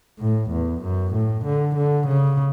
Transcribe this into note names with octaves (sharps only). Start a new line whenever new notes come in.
A2
E2
F#2
A2
D3
D3
C#3